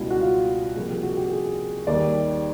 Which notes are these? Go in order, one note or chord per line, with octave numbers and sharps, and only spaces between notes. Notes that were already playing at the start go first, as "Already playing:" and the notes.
Already playing: C#2 B2 G3 E4
F#4
F4
C2 A#2 F3 G#4
G4
F#4
G4
G#4
D#2 D#3 G3 D5